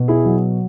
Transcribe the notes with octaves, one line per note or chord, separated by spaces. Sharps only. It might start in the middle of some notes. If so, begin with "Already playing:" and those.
Already playing: B2
E4 G#4
F#3